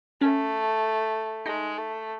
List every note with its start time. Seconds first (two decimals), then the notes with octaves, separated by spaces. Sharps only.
0.21 A3 C#4
1.46 G#3 D#4
1.78 A3